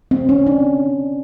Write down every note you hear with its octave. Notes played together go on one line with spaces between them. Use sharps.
C4
C#4
D4